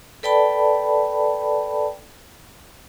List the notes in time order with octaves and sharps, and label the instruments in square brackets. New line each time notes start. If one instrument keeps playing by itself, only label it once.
[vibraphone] A4 B4 D5 G5 A5 B5